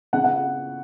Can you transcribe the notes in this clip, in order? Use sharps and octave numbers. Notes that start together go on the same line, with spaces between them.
C#3 F#5
F#5